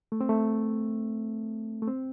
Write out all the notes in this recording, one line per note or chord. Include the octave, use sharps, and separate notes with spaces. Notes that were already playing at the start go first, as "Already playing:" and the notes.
A3
C4
A3
A3
C4